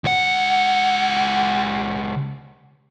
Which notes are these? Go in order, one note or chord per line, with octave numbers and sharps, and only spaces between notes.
C#2 F#5